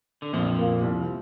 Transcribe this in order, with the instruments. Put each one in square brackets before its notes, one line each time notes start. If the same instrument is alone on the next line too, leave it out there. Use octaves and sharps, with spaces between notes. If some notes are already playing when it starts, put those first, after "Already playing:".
[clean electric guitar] D3
[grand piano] A#1 [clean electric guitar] F2 F3
[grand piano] A#2 A#3
C2